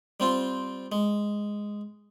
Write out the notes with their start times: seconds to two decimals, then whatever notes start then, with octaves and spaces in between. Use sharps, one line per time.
0.20 G3 C4 F4
0.92 G#3